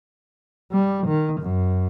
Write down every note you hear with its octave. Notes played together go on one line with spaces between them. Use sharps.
G3
D#3
F#2